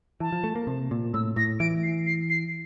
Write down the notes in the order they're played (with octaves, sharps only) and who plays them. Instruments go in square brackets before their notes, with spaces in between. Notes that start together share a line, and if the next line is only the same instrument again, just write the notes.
[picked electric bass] E3 [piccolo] A5
[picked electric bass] F3
A3
A#3
C3
A#2
[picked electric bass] A2 [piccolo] E6
[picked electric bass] A2 [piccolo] A#6
[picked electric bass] E3 [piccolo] D7
[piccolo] C7
C7
C7